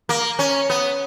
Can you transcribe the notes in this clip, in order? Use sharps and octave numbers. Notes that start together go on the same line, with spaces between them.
A#3
C#4
B3